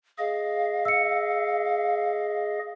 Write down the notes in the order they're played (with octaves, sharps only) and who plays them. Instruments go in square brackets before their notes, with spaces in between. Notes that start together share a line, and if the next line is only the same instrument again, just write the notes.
[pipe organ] G#4 D#5 [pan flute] F5
[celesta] E6 C#7